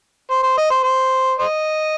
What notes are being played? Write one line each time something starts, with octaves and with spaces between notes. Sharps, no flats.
C5
C5
D#5
C5
C5
C5 D#5